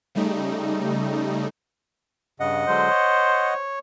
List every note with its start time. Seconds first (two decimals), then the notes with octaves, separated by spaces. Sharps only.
0.15 C#3 G3 A3 D#4
2.40 G2 C#3 D#5 F#5
2.68 D3 F#3 G#3 C5
2.90 C#5